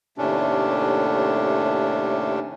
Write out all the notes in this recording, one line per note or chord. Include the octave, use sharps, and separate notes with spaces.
D#2 A2 C3 A3 C#4 D4